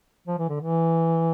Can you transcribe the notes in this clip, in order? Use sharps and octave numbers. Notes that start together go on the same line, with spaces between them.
F3
E3
D3
E3